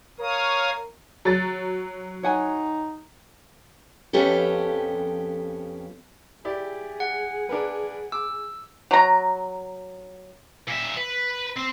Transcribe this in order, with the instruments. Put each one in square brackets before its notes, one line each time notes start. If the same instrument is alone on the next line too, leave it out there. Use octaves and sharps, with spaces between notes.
[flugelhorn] A#4 [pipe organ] C#5 F5 D#6
[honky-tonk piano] F#3 A6
[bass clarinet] D#4 [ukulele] C#5 F#5 G#5
[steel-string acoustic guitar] F2 F3 B3 C#4 G4 A4
[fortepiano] E4 G4 D5 [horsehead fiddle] G#4
[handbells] F#5
[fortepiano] D4 A#4 B4
[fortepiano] D6 [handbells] E6
[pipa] F#3 A#5
[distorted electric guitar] A#2 E5
B4
C4